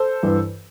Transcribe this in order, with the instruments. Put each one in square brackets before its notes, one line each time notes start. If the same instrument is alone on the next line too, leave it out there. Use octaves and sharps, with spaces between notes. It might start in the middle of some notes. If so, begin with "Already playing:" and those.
Already playing: [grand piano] A4 C5
G2 E3